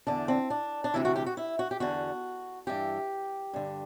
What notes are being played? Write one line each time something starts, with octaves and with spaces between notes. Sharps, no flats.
E2 D3 D4
C4
D4
D4
D2 C3 E3 E4
F#4
G4
F#4
E4
F#4
G4
E2 D3 F#4
G2 E3 G4
G2 D3